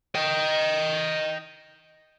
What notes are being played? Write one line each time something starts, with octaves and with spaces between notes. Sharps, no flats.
D#5 G5